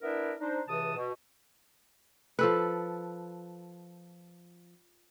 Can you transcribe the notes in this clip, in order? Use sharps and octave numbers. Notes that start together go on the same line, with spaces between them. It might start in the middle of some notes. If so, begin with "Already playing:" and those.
B3 D4 E4 A#4 D5 E5
D4 D#4 C5
C#2 C3 E3 A5 D#6
B2
F3 A4 B4